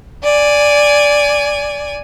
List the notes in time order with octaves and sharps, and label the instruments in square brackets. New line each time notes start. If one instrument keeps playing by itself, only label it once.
[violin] D5 G#5